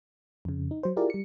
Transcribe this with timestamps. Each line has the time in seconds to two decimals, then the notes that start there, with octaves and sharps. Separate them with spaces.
0.45 F2 C#3
0.71 D#4
0.83 F#3 C5
0.96 E4 F4 G4 G#4 A#4 D5
1.10 G3 C#7